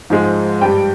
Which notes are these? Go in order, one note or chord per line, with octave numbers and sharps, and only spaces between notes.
G#2 F3 G#3
G2 G3 G5